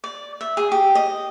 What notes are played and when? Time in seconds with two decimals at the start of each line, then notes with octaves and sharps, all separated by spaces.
0.04 D5
0.41 E5
0.57 G#4
0.72 G4
0.95 D#5